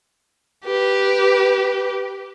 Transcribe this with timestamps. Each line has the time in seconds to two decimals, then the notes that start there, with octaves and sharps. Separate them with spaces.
0.65 G4 B4